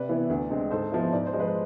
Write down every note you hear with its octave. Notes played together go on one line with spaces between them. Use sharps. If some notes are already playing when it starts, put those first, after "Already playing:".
Already playing: C3 B4 D5
E3 B3 E4
D2
D3 G#3 C4
G#2 A4 C5
F3 B3 E4
G#2 D5
C5
F3 G#3
B4